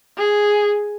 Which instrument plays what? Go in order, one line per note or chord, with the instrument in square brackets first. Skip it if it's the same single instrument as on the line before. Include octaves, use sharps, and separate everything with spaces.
[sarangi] G#4